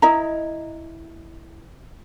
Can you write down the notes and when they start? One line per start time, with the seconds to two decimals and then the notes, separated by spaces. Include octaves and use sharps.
0.02 E4 D#5 A#5